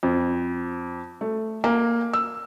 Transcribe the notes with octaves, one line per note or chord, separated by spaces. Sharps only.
F2
A3
A#3
E6